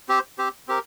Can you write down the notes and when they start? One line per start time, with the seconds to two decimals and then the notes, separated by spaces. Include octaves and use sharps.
0.08 C4 G4 C5
0.38 C4 G4 C5
0.68 C4 G4 A#4